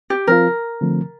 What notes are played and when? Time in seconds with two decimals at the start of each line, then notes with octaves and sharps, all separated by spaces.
0.10 G4
0.27 F3 C4 F4 A#4
0.81 D3 F3 A3 C4